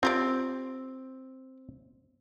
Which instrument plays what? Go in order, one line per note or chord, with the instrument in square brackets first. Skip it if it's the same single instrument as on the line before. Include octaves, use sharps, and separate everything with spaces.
[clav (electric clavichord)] C4 [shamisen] F4 G4 D5